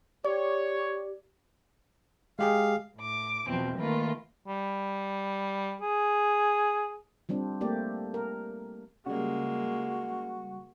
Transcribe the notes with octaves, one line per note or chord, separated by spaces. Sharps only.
G4 C#5 D5
G#3 G4 G#4 F5
A2 D6
E2 B2 F3 C4
D#3 A3 A#3 F4 A#4 B4
G3
G#4
F3 G3 C4 D4
A3 A#3 G4 D5
A#4
C#3 G3 G#3 A#3 F#4